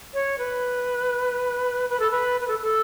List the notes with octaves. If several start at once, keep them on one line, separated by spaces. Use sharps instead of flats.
C#5
B4
B4
A4
B4
B4
A4
A4